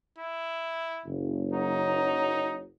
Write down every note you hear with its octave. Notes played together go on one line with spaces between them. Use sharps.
E4
F#1
F#3 D#4